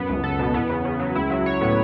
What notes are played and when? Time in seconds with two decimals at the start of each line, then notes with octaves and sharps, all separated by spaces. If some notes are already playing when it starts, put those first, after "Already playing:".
Already playing: F#2 F#3 B3
0.09 C#2
0.24 A4
0.39 B2
0.54 E2 E3 B3
0.70 C#3
0.85 C#3
0.99 F#3
1.15 C#2 C#3 E4
1.30 F#3
1.46 C#5
1.61 A2 B3